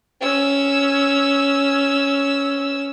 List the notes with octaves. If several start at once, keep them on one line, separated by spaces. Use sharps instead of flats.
C#4 E6